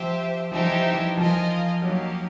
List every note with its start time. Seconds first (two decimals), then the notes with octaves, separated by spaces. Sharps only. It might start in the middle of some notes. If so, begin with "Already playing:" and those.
Already playing: F3 G4 C5 E5 G5
0.52 F3 D#4 G4 C5 E5 G5
0.65 E3
0.91 E3
1.17 F3 F4 A#4 D#5 G#5
1.82 F#3 A#3 D#4 G4